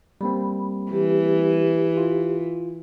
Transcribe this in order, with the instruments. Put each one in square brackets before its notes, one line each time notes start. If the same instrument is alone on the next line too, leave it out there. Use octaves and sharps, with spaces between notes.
[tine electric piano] G3 A#3 C4 [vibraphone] B5
[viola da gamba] E3 [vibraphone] G4
[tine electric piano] F4